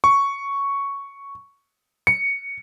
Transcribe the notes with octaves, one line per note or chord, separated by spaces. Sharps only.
C#6
C#7